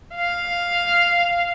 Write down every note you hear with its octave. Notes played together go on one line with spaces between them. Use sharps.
F5